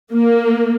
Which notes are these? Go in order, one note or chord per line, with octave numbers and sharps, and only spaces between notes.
A#3